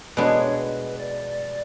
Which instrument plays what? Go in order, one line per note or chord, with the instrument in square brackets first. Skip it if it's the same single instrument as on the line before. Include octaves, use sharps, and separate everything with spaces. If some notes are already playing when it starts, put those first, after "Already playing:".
[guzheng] B2 G#3 B3 D4 G#4 [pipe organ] C#5
[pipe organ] B4
D5